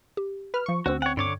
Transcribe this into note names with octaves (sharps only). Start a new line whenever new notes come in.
G4
B4 F6
F3 C#6
D2 C4 C#4 F#4 C5 E6
C#5 F#5 G5
G2 D3 C#5 D6 G#6